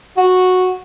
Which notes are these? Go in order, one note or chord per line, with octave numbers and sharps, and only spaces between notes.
F#4